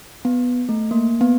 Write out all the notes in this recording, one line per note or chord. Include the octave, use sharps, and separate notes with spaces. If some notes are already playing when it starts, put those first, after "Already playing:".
B3
A3
A#3
B3